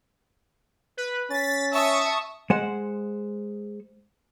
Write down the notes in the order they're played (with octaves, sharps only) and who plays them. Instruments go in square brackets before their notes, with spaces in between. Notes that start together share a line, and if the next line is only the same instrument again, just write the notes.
[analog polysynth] B4
[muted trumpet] C#4 [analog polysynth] A6 B6
[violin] E5 [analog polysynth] A5 C#6 D#6
[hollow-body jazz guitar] G#3 C5 F#5